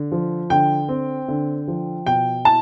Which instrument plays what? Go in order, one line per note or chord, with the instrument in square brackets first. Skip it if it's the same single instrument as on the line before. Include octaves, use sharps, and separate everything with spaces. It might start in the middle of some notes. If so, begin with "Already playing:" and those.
Already playing: [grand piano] D3
F3
[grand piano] D3 [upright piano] G5
[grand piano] C4
D3
F3
[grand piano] B2 [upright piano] G5
[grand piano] E4 [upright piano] A5